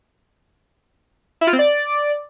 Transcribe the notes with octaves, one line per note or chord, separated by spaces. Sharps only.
E4
F4
C4
D5